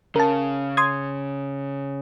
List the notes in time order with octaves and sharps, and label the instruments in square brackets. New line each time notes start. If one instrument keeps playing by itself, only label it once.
[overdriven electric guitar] C#3 [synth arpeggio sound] A#4 A5
[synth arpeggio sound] C6 D#6 G#6